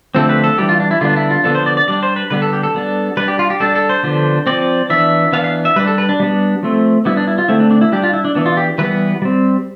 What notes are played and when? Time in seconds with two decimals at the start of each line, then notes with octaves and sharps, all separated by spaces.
0.15 D3 F3 A3 C4 A4
0.29 B4
0.44 A4
0.58 E3 G3 D4 G4
0.69 F4
0.80 D4
0.91 E4
1.01 D3 G3 B3 D4 F4
1.16 E4
1.30 F4
1.44 D3 F3 B3 D4 A4
1.55 C5
1.66 D5
1.77 D5
1.88 G3 D4 D5
2.03 C5
2.16 B4
2.30 D3 G3 B3 B4
2.42 A4
2.53 G4
2.63 A4
2.75 G3 B3 D4
3.17 G3 D4 B4
3.28 G4
3.39 F4
3.50 G4
3.60 G3 D4 A4
3.75 A4
3.89 C5
4.03 D3 F3 B3 D4
4.47 F3 C4 D5
4.90 E3 B3 D4 E5
5.33 E3 B3 D4 F5
5.44 F5
5.65 E5
5.76 G3 D4 B4
5.87 A4
5.98 B4
6.09 D4
6.20 G3 B3 D4
6.63 F3 A3 C4
7.05 G3 B3 D4 E4
7.17 D4
7.27 E4
7.38 F4
7.48 D3 A3 C4 E4
7.60 D4
7.71 D4
7.81 E4
7.92 G3 D4 G4
8.03 F4
8.13 E4
8.25 D4
8.35 E3 B3 D4
8.46 F4
8.57 G4
8.78 E3 G3 B3 B4
9.22 G3 C4